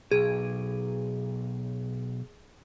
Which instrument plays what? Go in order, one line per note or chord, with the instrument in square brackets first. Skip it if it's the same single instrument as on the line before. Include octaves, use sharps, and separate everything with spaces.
[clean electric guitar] B1 [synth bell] G#4